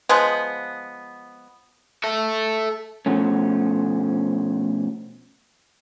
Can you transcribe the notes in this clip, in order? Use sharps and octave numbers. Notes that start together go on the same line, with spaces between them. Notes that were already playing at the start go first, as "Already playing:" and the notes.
F3 G#3 B3
A4 E5
B2 F3 A3 C#4